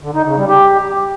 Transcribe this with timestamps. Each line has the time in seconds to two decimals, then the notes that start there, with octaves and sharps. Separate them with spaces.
0.03 D3
0.14 D#4
0.26 C#3
0.37 G3
0.48 G4